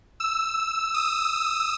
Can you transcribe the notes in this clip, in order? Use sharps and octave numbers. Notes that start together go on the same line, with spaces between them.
E6
D#6